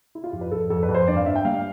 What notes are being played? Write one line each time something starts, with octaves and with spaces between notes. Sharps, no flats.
E4
F4
F2 G4
B4
F2 A4
F2 A4
B4
F2
C5
G2 D5
F5
G2 E5
G5
G3 F5